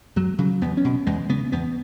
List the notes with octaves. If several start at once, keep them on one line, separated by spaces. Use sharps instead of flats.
F#2 F#3
C#3 F#3
E2 B3
C#4
B2
E2 G#3
C#3 B3
E2 B3